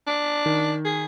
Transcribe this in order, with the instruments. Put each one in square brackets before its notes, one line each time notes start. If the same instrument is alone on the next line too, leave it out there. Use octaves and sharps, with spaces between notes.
[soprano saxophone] D4
[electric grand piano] D#3
[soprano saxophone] G#4